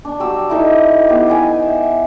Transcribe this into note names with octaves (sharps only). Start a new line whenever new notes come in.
D4
F#3 G4 E6
D#4 E4 A4 E5
B3 G4
B4 D#5 G5 G#5
E5